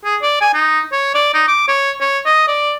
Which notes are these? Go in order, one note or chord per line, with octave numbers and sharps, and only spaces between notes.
G#4
D5
G#5
D#4
C#5
D5
D#4
D6
C#5
C#5
D#5
D5